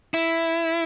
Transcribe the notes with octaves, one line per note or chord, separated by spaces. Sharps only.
E4